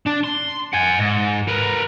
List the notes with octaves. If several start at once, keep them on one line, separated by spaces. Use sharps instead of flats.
D4
C6
F#5 G#5
G#2
A#4 B4